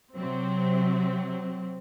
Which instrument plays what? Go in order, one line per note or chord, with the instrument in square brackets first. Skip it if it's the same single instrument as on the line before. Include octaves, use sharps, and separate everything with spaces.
[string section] C3 F#3 C4